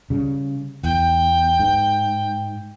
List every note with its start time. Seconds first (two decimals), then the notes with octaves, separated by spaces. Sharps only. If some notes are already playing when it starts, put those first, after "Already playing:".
0.10 C#3 G3
0.84 E2 G5
1.59 G#2